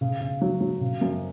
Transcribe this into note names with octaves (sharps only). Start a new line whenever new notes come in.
C#3
C#3
F#3
F#3
C#3
F#2